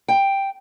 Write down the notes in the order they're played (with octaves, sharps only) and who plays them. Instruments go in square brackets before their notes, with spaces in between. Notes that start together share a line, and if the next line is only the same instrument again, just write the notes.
[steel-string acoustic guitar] G5